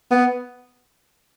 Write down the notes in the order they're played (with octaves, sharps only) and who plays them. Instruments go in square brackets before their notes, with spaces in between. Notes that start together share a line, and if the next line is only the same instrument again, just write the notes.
[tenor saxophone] B3